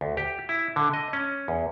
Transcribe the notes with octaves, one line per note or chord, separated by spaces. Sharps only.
D2
G4
E4
D3
D#5
C#4
E2